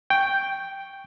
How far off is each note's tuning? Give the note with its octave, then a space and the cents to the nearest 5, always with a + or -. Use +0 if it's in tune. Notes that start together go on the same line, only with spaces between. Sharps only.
G5 +0 C#6 +0